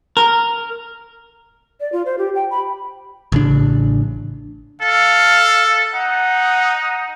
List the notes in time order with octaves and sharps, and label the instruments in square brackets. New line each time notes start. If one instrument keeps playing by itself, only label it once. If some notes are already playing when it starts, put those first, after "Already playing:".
[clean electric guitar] A#4
[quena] D5
F4
C5
G4
G5
B5
[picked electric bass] A1 C#3 D4
[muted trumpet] A4 [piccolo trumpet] F5
[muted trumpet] D#4 [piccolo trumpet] F#5